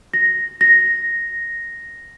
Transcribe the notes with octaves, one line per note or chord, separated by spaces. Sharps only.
A#6
A#6